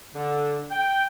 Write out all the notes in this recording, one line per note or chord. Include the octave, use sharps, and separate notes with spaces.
D3
G5